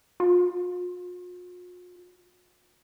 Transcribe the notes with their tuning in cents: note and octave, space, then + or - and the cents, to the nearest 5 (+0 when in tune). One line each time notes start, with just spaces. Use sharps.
F4 +45